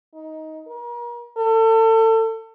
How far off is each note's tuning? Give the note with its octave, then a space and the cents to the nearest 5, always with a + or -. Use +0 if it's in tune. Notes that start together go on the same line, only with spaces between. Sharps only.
D#4 +15
A#4 +40
A4 +30